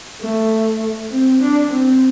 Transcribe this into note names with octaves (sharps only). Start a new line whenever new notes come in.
A3
C4
D4
C4